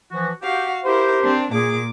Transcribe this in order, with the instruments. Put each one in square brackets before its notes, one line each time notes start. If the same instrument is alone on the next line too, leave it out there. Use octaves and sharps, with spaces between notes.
[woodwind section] E3 F3 F#4
[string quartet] F#4 F5 [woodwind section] G4
[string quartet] E4 A#4 [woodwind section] G4 C5
[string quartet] C4 D4
[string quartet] A#2 D6 [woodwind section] G#4